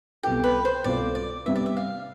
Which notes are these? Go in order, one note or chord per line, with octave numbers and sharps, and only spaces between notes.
C2 B2 B3 F4 G4 A4
B4
C5
C2 B2 B3 F4 A4 D5
D5
C3 G3 B3 E5
D5
E5
F5